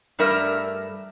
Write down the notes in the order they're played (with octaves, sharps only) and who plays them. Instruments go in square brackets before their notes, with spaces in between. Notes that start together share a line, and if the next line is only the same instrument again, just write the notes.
[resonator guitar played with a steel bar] G2 G3 A3 A#4 E5